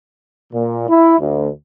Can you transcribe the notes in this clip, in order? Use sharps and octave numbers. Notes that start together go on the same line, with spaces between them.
A#2
E4
D2